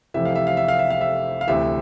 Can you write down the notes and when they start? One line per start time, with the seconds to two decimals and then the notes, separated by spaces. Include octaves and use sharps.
0.14 F1 F2 C3 E3 E5
0.25 F5
0.36 E5
0.47 F5
0.57 E5
0.68 F5
0.79 E5
0.90 F5
1.01 E5
1.41 F5
1.47 D2 C3 E3 E5